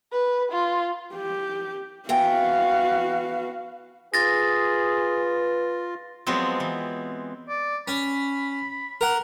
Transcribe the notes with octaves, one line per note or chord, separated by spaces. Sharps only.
B4
F4
G4
E3 B3 F#4 F5 G5
F4 G#4 B4 A6 A#6
F3 F#3 G#3 B3 C4
E3
D5
C#4 B5
A#4 F#5